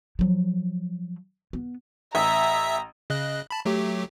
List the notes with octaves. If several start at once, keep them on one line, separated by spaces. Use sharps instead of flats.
F3 F#3
B3
A1 E5 A#5
C#3 D#5 F#6
A5 B5
F#3 A3 G4